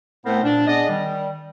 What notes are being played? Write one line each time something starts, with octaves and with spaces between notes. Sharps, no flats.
A2 A3 B3 C4 A#4 C5
A#2 D4
B3 D4 G#4 D5 D#5
D#3 G3